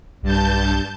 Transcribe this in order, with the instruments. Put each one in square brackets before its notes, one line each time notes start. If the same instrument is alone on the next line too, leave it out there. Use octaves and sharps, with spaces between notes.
[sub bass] B1 [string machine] G2 A5 G6